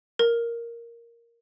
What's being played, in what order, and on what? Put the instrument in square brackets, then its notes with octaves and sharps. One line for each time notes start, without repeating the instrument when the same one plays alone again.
[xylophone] A#4